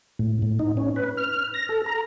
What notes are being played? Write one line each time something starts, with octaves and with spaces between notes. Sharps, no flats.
A2
A2
D#4
C#4
B4
F6
A#6
A4
A#5